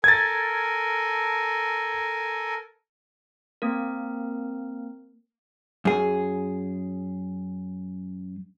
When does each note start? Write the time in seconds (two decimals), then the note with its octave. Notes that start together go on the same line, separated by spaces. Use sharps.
0.04 A4 A#4 G#5 G#6 A6
3.62 A#3 C4 A#4
5.85 F#2 G#4